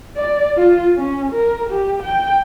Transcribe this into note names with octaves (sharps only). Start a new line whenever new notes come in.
D5
F4
C#4
A#4
G4
G5